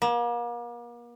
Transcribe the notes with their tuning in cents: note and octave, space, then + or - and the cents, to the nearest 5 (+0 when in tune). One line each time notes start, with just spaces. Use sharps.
A#3 +40